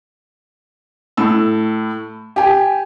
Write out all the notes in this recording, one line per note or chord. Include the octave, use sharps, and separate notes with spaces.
A2 E6
G4 G#5